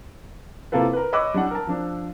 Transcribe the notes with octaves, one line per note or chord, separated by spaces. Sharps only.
C3 A#3 E4 F4 A4 B4
A#4 B4
C#5 D#5 B5 D6 E6 F#6
G3 D4 F#5
A#4 A5
F3 D4